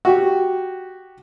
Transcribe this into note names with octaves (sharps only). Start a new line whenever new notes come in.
F#4 G4